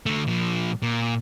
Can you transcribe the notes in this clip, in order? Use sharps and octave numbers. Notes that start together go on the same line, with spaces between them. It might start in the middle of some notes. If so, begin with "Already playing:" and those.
D3 A3
A#2 F3
A#2